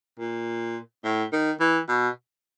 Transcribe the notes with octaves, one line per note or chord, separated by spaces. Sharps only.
A#2
A2
D#3
E3
B2